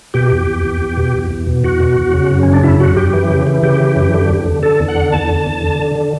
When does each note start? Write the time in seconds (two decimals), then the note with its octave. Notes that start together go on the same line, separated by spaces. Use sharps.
0.14 B2 G4
0.31 E2
0.47 E2
0.64 E2
0.81 E2
0.97 B2
1.14 E2
1.31 E2
1.47 B2
1.64 E2 F#4
1.80 B2
1.97 E2
2.14 C#3
2.31 F#2
2.43 C#3 C#4
2.53 D4
2.63 F#2 E4
2.80 F#2 F#4
2.97 F#2 G4
3.13 E3
3.30 C#3
3.47 E3
3.63 C#3 G4
3.79 E3
3.96 F#2
4.13 D3
4.29 E2
4.46 D3
4.63 D3 A4
4.79 E2
4.88 F#5
4.96 D3
5.12 E2 A5
5.29 D3
5.46 E2
5.63 D3
5.79 D3
5.95 D3